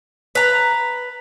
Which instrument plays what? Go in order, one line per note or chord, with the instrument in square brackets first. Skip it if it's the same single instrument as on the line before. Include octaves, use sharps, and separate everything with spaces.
[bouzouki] B4 A#5